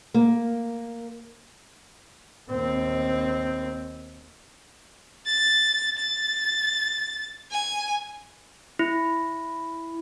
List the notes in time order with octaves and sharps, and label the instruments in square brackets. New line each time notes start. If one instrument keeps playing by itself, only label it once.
[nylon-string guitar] A#3
[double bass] D#2 C4
[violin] A6
A6
G#5
[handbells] E4